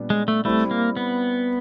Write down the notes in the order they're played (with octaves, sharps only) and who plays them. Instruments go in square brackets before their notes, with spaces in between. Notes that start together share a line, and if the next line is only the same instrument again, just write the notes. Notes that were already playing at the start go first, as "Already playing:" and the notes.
Already playing: [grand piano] A#2 G3 B3 D4
[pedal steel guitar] G#3
A3
[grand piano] G3 C4 E4 [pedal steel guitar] A3
[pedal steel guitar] A#3
B3